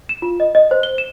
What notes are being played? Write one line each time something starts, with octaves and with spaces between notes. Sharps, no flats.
E7
F4
D#5
D#5
C5
G7
E7